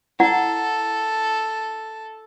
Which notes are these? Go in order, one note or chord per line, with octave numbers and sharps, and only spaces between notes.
E4 A4 D5 F#5